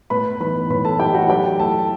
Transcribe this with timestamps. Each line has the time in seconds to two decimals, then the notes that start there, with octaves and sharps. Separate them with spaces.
0.10 A2 B4 B5
0.40 E3 B3 D#4 B4 B5
0.70 A2 B4 B5
0.85 A4 A5
0.99 E3 B3 D#4 G4 G5
1.14 F#4 F#5
1.29 F#3 G4 G5
1.59 A3 E4 A4 A5